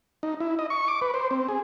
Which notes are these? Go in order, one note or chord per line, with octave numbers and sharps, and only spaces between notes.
D#4
E4
D#5
C#6
D6
B4
C5
C4
G#4